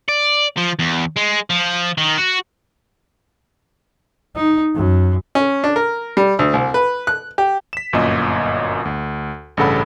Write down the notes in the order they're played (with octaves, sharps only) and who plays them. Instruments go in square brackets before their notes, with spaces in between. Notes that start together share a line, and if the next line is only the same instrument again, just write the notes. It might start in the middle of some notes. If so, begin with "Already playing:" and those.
[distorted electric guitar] D5
F3
E2
G#3
F3
D#3
F#4
[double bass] D#4
F#2
[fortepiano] C#4
D4
A#4
G3
D2
C2
B4
F#6
G4
[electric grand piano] B6 E7
G1 F#2 A#2 D#5
D2
A1 G2 C#3 A4 F#5 B5